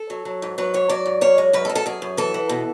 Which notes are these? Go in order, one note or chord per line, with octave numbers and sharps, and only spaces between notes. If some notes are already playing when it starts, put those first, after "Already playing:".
Already playing: A4
F#3
F#3
G#2
F#3 B4
G#2 C#5
F#3 D5
G#2
F#2 C#5
G#3
F#2 B4
A4
F#2
A4
F#2 G#4
F#2
E3 A4
E3
B2